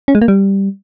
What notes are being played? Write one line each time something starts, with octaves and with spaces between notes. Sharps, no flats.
C#4
G#3
A#3
G3